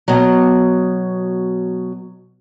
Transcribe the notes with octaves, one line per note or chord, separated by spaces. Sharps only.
B2 F#3